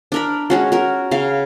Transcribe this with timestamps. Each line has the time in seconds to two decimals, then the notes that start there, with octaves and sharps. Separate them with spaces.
0.12 D4 A#4 B5
0.50 G#3 C#4 F#4
0.72 F#4 A#4
1.11 C#3 F5